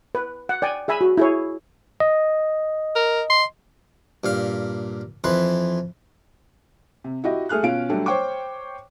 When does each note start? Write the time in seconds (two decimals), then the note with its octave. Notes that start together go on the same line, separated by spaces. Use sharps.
0.15 B4
0.49 F#5
0.62 D5 G5 G#5
0.88 G#4 E5 G#5 B5
1.01 F#4
1.18 E4 G#4 C#5
2.00 D#5
2.96 A#4
3.30 C6
4.24 G2 A#2 F5
5.24 F2 E3 B4 C6
7.04 C3
7.24 E4 F#4 G4 D#5
7.49 A3 G#4 F6 F#6
7.63 B2 C#4 F4 F5 D7
7.90 F#3 G3 A3 D4
8.06 C5 C#5 G5 C#6 D6